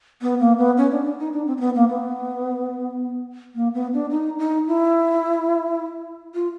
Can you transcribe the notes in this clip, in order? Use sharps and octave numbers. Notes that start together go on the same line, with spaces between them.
B3
A#3
B3
C#4
D4
D4
D#4
D4
C4
C4
B3
A#3
B3
A#3
B3
D4
D#4
D#4
E4
F4